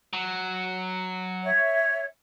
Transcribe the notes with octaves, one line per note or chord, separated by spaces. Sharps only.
F#3
C#5 E5